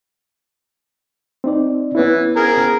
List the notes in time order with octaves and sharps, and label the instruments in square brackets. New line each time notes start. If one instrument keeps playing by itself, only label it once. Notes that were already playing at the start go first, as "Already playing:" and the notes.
[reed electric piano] C4 D#4 D5
[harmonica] E3 [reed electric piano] B3 C#4 E4
[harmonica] G#4 A#4